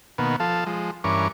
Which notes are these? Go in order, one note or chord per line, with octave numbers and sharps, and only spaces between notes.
B2 D#3 A#3 B3
F3 A4 F5 A5
F3 G#3
G2 E3 C#4 A#4 C#6 D6